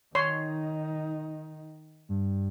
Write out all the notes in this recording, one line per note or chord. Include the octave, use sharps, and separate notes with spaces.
D#3 D#4 C#5 C6
G2